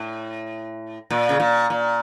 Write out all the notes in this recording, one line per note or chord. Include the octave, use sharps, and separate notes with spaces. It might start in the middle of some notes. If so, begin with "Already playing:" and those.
Already playing: A2
A#2
C#3
A#2
A#2